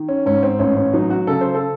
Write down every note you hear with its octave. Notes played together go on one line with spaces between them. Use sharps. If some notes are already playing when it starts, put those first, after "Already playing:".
Already playing: D#3
C#4
G#2 C#4
C4
A1 C#4
C#4
F#3 D#4
F#4
C#3 A4
C5
A4